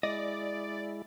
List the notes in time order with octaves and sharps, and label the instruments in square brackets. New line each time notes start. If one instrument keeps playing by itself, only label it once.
[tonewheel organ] G#3 E4 [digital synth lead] D5 [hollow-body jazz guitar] D#5